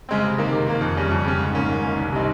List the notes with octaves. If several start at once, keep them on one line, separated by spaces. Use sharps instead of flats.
C#3 G#3 C4
C3
D#3 A#3
C3
D#3 A#3
F2
C#3 G3 C#4
F2
C#3 G3 C#4
G#2
D#3 A#3 C#4
G#2
D#3 A#3 C#4
C2
C3 G3 C4 D#4